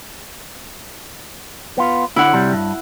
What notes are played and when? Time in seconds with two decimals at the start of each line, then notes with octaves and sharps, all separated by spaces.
1.78 B3 F4
2.16 D3 E4 F#5
2.33 C3 G3
2.53 G2